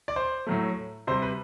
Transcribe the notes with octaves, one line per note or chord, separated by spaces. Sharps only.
D5
C5
A2 F#3 A3
C3 G3 C5
B4